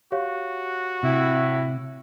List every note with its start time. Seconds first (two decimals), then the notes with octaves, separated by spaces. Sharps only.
0.12 F#4 G4 C#5 F5
1.03 A2 C3 E4